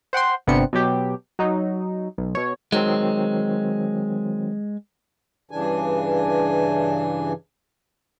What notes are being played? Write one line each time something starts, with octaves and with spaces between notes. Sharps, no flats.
C5 F#5 G5 C6
G1 C3 B3 C4 D4 C#7
B2 F#3 G4
F#3 D#4
B1
B2 C#5
D#3 F#3 G#3 C4
G2 C#3 E3 D4 G#5